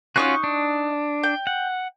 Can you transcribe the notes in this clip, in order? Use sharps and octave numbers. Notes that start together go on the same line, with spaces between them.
C#4 D#4 F4 F#4 C#6 F#6
D4
G5
F#5